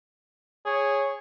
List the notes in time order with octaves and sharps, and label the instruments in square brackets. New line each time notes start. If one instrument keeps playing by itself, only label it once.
[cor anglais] G#4 [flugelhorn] C#5